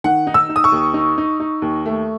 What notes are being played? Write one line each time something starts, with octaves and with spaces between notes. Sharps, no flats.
D#3 F#5
D#4
E6
D#4
D#6
C#6
D#2
D#4
D#4
D#4
D#2
A3